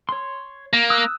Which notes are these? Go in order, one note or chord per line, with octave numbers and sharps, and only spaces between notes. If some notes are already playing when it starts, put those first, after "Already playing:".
C#5 C6
A#3
D#6 E6 F#6